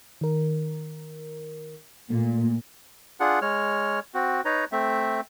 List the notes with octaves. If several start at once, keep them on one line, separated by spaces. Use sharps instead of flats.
D#3 A#4
A#2 A3
D4 F4 G#4 F#5
G#3 C#5 F6
C4 F#4
D#4 B4 C#5 A#5
A3 C4 E5